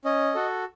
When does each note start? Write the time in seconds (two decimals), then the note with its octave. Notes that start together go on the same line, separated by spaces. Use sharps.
0.05 C#4 D#5
0.34 F#4 A4